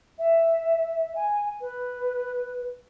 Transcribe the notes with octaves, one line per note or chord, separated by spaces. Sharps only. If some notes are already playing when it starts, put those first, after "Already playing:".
E5
G#5
B4